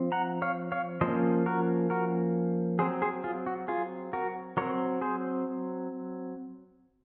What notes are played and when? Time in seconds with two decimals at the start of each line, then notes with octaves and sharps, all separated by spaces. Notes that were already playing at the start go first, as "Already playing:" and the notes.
Already playing: F3 C4
0.12 F#5 A#5
0.42 C#5 F5
0.72 C#5 F5
1.01 F3 A#3 C#4 C5 D#5
1.46 F#4 A#4
1.90 F#4 A#4
2.79 F#3 C4 G#4 C5
3.02 G#4 C5
3.24 F4 G#4
3.46 F#4
3.68 F4 G#4
4.13 F#4 A#4
4.57 F#3 C4 A#4 C#5
5.01 G#4 C5